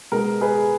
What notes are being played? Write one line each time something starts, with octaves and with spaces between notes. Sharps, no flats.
B2 G#3 B3 A#4
G#4 B4